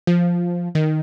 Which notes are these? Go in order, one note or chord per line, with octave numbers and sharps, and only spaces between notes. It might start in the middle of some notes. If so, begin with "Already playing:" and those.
F3
D#3